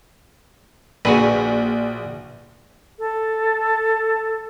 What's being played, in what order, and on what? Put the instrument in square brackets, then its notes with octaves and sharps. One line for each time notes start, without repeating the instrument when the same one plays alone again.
[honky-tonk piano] A#1 [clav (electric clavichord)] F#4 G#4 B4
[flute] A4